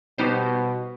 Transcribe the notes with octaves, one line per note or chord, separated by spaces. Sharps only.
B2 G3 B3 D#4 G4 C5